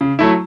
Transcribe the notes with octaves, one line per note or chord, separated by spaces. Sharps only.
C#3
F#3 A3 E4